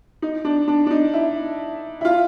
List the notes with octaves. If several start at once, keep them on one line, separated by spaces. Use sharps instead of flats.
D#4
D4
D4
D4
D#4
E4
E4
F4